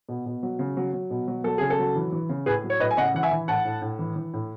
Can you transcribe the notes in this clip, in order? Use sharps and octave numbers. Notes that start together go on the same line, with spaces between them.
B2
B2
F#3
C#3
F#3
F#3
B2
F#3
F#3 A4
C#3 G#4
A4
F#3
E3
E3
C#3
A2 G#4 B4
F#3
C#5
A2 B4 D#5
G#5
C#3 D#5 F#5
E3 F#5
E5 G#5
E3
A2 F#5 A5
A2
A2
E3
E3
A2